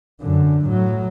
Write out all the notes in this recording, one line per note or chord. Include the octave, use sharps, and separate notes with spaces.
F#2 D3
A2 F#3